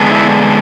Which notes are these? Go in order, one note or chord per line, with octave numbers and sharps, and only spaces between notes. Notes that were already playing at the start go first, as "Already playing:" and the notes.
Already playing: D3 G#3 B3 D4
E4